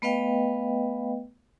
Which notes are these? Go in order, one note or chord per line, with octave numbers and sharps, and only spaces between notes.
A3 B3 B4 D#5 F5 G5